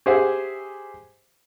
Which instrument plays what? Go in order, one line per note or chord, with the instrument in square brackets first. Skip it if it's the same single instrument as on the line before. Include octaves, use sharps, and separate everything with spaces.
[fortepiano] G4 G#4 C5 E5 F#5